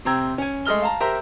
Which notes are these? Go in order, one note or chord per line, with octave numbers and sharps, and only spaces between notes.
C3 C4 G5 A#5 E6 G#6
C#4 G#5
G#3 A3 D#5 F6 G7
F5 A5 A#5
G4 A#4 C5 E5 A#5